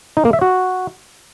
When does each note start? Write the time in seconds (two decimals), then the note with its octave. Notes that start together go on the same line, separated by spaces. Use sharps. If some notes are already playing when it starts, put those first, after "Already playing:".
0.17 D#4
0.25 A#3
0.33 E5
0.41 F#4